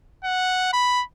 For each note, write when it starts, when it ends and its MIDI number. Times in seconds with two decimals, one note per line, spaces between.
0.24 0.71 78
0.73 1.03 83